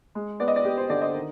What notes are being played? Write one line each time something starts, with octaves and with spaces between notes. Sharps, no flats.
G#3
B3 D5
D#5
D5
B3 G4
C5
D3 D5
D#5
D#3